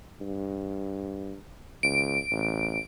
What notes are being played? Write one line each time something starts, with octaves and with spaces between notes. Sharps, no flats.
G2
C#2 D7
A1